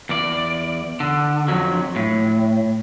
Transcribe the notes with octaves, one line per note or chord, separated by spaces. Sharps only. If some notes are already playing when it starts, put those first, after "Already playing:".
E2 D5
D3
F2 F#3
A2